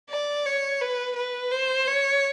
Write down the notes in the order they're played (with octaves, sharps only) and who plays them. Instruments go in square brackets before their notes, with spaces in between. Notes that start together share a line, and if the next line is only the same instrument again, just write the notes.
[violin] D5
C#5
B4
B4
C5
C#5